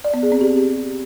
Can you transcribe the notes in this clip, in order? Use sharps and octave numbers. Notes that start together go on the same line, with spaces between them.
D5
B3
G#4
C4
G4